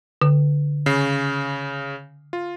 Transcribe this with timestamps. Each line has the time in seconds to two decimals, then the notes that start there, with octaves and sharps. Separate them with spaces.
0.21 D3
0.86 C#3 C7
2.33 F4